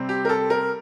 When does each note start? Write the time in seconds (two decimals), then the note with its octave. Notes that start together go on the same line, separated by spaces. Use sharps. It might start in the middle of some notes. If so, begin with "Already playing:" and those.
Already playing: C3 G3 C4
0.09 G4
0.25 A#4
0.29 A4
0.50 A#4